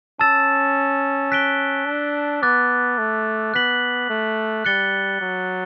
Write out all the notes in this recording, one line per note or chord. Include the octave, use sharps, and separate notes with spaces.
C#4 A5 E6 A6 E7
F#6 B6 D7 G7
D4
B3 D6 F#6 A6
A3
B3 F#6 B6 F#7
A3
G3 F#6 A6 C#7 G7
F#3